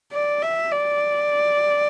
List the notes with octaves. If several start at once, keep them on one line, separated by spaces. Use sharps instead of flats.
D5
E5
D5